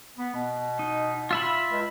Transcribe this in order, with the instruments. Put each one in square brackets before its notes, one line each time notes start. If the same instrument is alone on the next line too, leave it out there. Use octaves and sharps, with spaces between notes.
[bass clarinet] B3
B2
[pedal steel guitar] D#4
F4 E5 B5
[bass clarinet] C#2